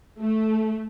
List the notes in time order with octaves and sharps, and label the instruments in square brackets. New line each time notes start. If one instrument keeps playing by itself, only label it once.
[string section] A3